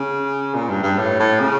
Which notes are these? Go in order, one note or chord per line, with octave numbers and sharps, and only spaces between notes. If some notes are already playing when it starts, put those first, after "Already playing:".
Already playing: C#3
A#2
G2
G2
A2
A2
C#3